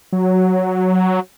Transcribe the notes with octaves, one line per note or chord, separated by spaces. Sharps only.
F#3